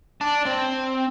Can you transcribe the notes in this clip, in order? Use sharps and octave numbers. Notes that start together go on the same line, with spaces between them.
D5 A5
C4